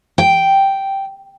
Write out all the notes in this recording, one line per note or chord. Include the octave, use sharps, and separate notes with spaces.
G5